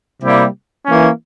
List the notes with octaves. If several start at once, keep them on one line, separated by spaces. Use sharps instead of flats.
C3 G3 A#3 E4 G4
E3 A#3 C#4